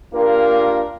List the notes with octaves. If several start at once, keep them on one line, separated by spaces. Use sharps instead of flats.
A#3 D4 F4 G4 A#4